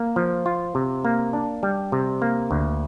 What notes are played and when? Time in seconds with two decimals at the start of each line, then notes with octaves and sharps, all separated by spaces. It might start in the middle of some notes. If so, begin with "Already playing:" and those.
Already playing: A#3
0.16 F3
0.46 F4
0.75 C3
1.05 A#3
1.33 D4
1.63 G3
1.92 C3
2.22 A#3
2.51 D2